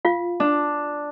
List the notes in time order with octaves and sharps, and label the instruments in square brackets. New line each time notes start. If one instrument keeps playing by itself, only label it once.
[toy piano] F4 F5
[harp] D4